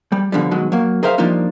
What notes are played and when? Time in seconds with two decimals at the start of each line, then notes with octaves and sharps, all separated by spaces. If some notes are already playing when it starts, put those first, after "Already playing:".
0.12 G3
0.32 B2 D3 F3 G3
0.51 B2 D#3 F#3 G#3
0.72 F#3 A#3
1.03 G#4 A#4 C5 E5 F5
1.18 F3 G3 A#3 D4 D#4 F4